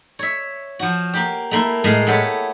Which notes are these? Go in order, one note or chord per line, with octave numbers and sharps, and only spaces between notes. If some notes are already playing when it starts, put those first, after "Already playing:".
C#5 E5
F3 F#4
A#3 G4
A3 A#3 E4
A2 G#3 A3 D#5 F5
B3 E4 G4 A4 C#5